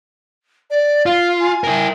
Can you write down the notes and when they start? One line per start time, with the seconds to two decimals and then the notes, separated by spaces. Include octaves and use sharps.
0.70 D5
1.06 F4 F5
1.39 G#5
1.64 E4 A#4